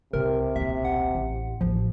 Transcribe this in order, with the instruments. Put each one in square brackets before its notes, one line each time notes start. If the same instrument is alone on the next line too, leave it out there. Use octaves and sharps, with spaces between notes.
[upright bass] C2 [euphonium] C3 [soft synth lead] A#4
[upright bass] D#1 B1 [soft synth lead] E5
[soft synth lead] F#5
[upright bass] A1
[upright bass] A1 D#2 [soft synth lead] F3